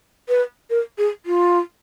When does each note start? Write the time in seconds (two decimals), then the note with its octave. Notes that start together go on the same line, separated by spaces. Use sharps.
0.29 B4
0.70 A#4
0.98 G#4
1.26 F4